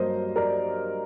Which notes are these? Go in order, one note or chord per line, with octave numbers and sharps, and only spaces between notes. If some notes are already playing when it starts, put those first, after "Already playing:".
Already playing: G2 F#3 A#3 A#4 C5 D#5
A#4 D5